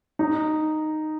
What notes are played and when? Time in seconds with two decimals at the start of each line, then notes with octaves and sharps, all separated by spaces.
0.19 D#4